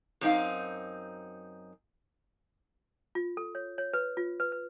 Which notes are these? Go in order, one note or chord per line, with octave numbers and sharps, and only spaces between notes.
F#2 C4 D#4 F5
F4
A4
C#5
C#5
B4
F4
B4
B4